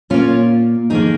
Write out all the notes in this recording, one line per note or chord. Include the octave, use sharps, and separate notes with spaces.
A#2 A#3 C#4 F4
F2 D#3 A#3 D#4 G#4